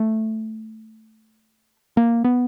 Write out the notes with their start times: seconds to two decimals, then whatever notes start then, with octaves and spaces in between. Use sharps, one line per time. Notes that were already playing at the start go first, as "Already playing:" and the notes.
Already playing: A3
1.97 A#3
2.24 B3